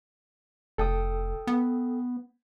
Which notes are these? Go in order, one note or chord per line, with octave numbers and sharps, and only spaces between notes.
F1 A4 G5 D#6
B3